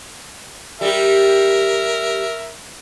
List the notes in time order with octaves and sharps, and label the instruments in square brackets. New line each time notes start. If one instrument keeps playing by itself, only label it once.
[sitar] G3 G4 [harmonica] A#4 E5